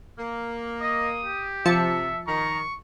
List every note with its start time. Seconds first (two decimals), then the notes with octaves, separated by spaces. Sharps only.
0.18 A#3
0.81 D#5 D#6
1.23 G4
1.66 C3 F3 E5 A5 C#7
2.27 D#3 A#5 C#6